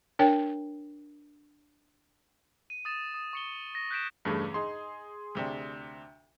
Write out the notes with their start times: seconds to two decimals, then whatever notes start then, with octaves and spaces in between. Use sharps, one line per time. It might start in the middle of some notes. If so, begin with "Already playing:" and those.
0.19 D4 A#4 C#5 G5
2.70 D#7
2.85 D#6 A6 E7
3.14 D#6
3.33 C#6 C#7 G7
3.75 A#6
3.91 F#6 G6 B6 D7 E7
4.25 E2 G2 C#3 A3
4.54 D#4 G#4 C6
5.35 D2 C3 D4